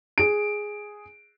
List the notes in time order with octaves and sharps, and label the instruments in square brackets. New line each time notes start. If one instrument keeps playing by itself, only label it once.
[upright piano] G#4 D7